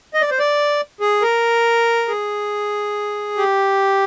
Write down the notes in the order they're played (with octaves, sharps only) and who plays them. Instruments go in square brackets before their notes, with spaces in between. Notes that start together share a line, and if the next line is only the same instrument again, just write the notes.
[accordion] D#5
D5
C5
D5
G#4
A#4
G#4
G4